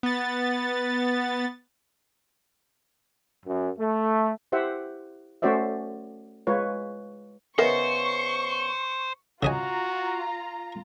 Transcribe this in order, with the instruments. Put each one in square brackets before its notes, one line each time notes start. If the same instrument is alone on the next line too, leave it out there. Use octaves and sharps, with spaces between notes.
[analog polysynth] B3 A6
[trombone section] F#2
A3
[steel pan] E4 G4 C5 E5 F#5
A3 C#4 F#4 C5 D5 E5
G#3 F4 B4 C#5
[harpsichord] C#3 B3 D#4 [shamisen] A#4 D#5 E5 [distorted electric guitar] C5 [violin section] C#6
[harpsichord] C#3 D#5 G#5 [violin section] F4 A#5 [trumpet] F#4